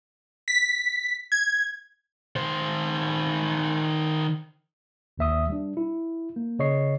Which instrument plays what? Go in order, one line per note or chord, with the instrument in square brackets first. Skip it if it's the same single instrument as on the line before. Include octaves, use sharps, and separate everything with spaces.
[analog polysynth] B6
G#6
[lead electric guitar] D#3 C5
[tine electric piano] G1 D#2 E5 D#6
G3 D4
E4
A#3
C#3 C#5 D#5 C#6 C7